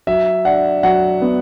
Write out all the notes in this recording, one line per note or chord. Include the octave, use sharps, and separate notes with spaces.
F#3 E5
D4 F#5
F#3 F#5
B3